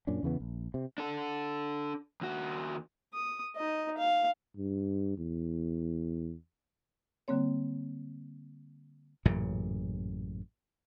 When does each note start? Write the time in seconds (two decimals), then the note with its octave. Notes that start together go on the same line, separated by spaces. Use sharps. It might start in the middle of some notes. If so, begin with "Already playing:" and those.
0.07 F#2 A#2 C#4 D4
0.23 E2 C#3 E3 B3
0.40 A#1
0.74 C3
0.98 D4 A4
2.21 D#2 F#4
3.14 D#6
3.56 D#4 D#5
3.98 F5
4.57 G2
5.18 E2
7.28 D3 G3 A#3 C4 C#5
9.25 A1 F#2 A#2 C#3